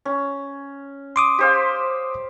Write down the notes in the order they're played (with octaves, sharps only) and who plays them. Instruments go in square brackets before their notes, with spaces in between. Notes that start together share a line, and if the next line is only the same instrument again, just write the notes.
[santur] C#4
[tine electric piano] C6 D6 D#6
[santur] G4 C5 F5